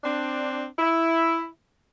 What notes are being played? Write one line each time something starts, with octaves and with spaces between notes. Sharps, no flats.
C4 D4
E4